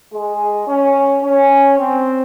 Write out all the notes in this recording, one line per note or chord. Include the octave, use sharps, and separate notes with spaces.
G#3
C#4
C#4
C4